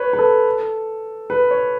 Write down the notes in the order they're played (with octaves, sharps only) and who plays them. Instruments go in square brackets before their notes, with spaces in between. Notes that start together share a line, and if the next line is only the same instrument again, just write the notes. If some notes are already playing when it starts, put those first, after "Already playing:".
Already playing: [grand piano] B4 C#5
B4
A4
B4
C#5